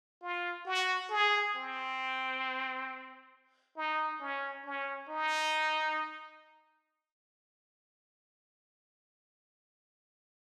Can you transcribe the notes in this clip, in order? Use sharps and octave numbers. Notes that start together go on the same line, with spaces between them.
F4
F#4
G#4
C4
D#4
C#4
C#4
D#4